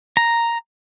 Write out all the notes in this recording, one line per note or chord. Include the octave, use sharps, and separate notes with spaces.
A#5